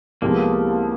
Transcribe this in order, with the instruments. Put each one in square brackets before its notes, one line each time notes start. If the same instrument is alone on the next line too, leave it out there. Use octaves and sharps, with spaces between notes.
[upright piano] C2 C3 F3 G#3 B3 [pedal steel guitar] A#3